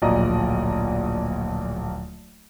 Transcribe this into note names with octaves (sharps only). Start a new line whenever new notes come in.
D1 A#1 A#2 D5 D#5 A#5